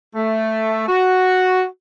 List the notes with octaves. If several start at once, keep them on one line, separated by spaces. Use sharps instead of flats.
A3
F#4